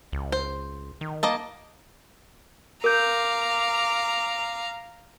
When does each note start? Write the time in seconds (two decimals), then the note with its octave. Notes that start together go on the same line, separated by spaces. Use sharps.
0.12 C#2
0.32 C5
1.01 D#3
1.23 A#3 D#5 A5
2.84 A#4 F5 A#5 D6 G6